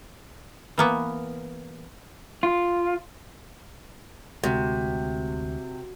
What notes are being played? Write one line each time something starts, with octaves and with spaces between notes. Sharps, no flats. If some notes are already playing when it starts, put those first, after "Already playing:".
E3 A#3 B3
F4
D2 C3 G#3 F#4